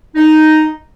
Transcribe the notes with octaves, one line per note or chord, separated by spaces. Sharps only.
D#4